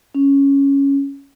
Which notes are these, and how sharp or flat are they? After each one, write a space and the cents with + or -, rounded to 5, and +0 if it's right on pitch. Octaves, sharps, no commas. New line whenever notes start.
C#4 +0